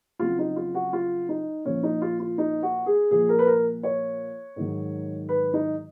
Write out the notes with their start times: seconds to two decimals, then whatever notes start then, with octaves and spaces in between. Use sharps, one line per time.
0.19 F2 C#3 F#3 F4
0.39 D#4
0.56 F4
0.74 F#4
0.93 F4
1.29 D#4
1.65 A#2 F3 C#4
1.83 D#4
2.02 F4
2.20 F4
2.38 D#4
2.63 F#4
2.86 G#4
3.11 A#2 F3 G#4
3.29 A#4
3.39 B4
3.47 A#4
3.83 C#5
4.56 G#2 D#3 F#3
5.29 B4
5.54 D#4